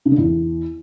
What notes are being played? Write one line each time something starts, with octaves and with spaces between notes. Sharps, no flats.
C#3
D3
E2